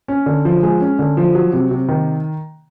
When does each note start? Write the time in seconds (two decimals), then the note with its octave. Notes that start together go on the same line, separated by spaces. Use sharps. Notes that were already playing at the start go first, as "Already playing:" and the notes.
0.08 C#4
0.26 D3
0.45 F3
0.63 G#3
0.81 C#4
0.99 D3
1.17 F3
1.35 F#3
1.53 C3
1.71 C3
1.89 D#3